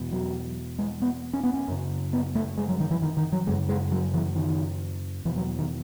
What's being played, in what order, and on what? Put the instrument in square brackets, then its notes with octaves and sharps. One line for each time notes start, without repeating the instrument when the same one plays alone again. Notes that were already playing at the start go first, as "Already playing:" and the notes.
Already playing: [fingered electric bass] E2 B2
F#3
G#3
B3
C#4
B3
C#4
F#2 C#3
B3
A3
G#3
F#3
D#3
E3
D#3
D#3
F#3
F#2 C#3 G#3
G#3
F#3
E3
D#3
E2 B2 E3
F#3
D#3